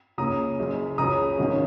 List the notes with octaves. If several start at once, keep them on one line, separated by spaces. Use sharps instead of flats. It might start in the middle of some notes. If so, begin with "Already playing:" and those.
C#2 C#3 A#3 C#4 A#5 D#6
F#1 F#2 C#3
C#2 C#3 F#3 C#4 A#5 D#6
G#1 G#2 D#3 F#3 C#4